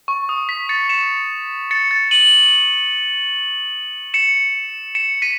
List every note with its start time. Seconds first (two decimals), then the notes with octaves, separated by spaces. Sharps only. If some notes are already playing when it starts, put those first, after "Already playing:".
0.08 C#6
0.29 D#6
0.49 B6
0.69 A6 C#7
0.89 C#7 E7
1.71 A6 C#7
1.91 A6
2.11 D#7 F#7
4.14 C#7 E7
4.95 C#7 E7
5.22 B6 D#7